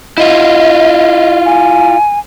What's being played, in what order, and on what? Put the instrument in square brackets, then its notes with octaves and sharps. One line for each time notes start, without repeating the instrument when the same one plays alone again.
[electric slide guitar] E4 F4 [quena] D#5
[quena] G#5